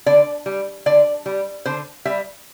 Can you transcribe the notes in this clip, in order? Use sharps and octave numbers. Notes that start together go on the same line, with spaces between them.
D3 D5
G3
D3 D5
G3
D3 C5
G3 E5